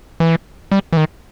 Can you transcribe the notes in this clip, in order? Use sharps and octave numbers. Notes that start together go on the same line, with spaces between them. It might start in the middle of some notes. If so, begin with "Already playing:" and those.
E3
G3
E3
D#3